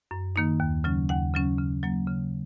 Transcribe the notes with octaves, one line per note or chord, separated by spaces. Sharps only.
F#2
D#3 A#3 D#4
D#2
C#3 F#3 C#4
D#2 F#5
C#3 F#3 C#4
C#3
F#3 A#3
C#3